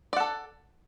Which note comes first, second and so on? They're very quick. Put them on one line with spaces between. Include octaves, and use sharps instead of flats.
D5 F#5 A4